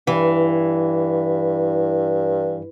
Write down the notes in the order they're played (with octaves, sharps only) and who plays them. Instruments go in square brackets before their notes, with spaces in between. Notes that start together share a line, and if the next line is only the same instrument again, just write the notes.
[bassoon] G2 [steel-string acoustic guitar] E3